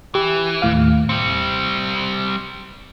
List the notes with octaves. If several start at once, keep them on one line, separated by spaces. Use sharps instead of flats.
E3 G4
D#2 A2 F5
G3 C4 C#7